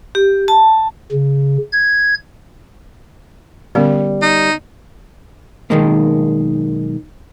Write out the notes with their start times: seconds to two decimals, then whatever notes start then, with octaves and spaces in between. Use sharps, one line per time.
0.15 G4
0.48 A5
1.12 C#3
1.72 G#6
3.75 D3 G3 B3 C#4
4.22 D#4
5.70 B1 G#2 D#3 G#3 A#3